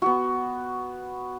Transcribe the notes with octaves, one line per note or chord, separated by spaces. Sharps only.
B3 F#4